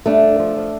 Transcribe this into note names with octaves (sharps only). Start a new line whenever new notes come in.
G2 A3 D4
G2
F3
F3